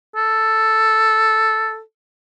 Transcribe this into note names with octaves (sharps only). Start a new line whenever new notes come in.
A4